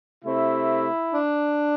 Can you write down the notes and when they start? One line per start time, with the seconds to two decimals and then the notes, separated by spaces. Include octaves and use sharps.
0.24 C3 A3 C4 E4
1.13 D4